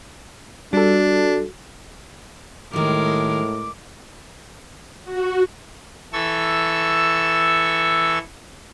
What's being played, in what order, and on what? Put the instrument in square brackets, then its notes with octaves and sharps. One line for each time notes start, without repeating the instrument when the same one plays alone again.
[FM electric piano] G3 A4 [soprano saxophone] D4 [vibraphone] F#4
[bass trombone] A2 [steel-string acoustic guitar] D#3 G3 [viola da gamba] G#3 A#4 [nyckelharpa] D6
[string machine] F#4
[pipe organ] E3 A4 C#6 E6